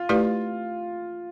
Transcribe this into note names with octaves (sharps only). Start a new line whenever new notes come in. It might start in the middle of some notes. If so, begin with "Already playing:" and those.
Already playing: F4
A3 E4 G4 B4 D5